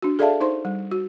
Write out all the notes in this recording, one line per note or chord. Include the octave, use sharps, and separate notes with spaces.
D4 F#4
G#4 A4 D5 E5 F5 A5
D#4 C5 C6
G3
F#4